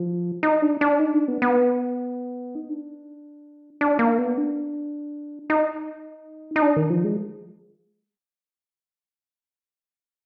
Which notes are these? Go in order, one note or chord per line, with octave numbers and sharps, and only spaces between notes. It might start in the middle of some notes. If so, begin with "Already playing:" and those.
Already playing: F3
D#4
D4
D4
D#4
D4
B3
B3
D#4
D4
D4
A#3
B3
D4
D#4
D#4
D4
D#3
F3
G#3